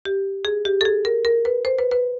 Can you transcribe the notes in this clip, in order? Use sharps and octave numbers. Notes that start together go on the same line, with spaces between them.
G4
G#4
G4
A4
G#4
A#4
A#4
B4
C5
B4
B4